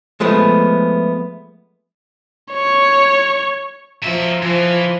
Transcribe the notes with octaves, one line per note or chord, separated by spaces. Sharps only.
F3 G#3 A3 B3
C#5
F3 F#3 E5
E3 F3